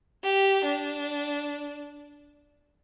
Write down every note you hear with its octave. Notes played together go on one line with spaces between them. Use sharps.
G4
D4